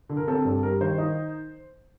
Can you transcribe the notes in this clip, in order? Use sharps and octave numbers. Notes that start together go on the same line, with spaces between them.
D3
A#4
C4 A4
G2 A4
G3 A#4
D#3 C5
D#4